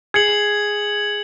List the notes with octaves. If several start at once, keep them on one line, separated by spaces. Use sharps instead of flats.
G#4 G#6 C#7 F#7